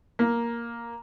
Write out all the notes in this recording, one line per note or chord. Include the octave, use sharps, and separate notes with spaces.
A#3